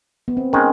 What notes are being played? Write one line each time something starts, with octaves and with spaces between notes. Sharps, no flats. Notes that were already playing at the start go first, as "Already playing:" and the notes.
B3
C4
D#3 G#3 C#4